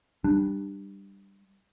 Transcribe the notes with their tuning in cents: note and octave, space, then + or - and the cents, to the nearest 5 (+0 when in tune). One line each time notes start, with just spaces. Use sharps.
G3 +5 D4 +20